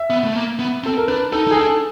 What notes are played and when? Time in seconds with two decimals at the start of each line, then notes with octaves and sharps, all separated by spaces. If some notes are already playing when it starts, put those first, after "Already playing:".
Already playing: E5
0.10 B3
0.24 A3
0.35 A#3
0.59 B3
0.84 C4 A4
0.97 A#4
1.08 D4 B4
1.32 D#4 A4
1.47 D#4 G#4
1.57 D4 A4